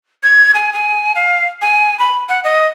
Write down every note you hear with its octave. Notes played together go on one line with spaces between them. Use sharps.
G#6
G#5
G#5
F5
G#5
B5
F#5
D#5